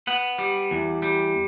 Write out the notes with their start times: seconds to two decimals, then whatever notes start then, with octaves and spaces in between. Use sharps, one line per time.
0.07 B3 F#5
0.39 G3
0.71 E2
1.02 G3